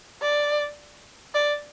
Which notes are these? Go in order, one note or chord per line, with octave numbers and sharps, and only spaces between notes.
D5
D5